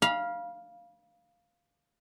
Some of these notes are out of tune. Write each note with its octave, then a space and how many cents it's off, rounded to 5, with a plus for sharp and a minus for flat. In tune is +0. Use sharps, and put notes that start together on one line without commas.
F5 +0 B5 -35